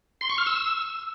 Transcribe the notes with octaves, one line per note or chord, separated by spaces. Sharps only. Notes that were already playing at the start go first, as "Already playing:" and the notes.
C6
C#6
F6
E6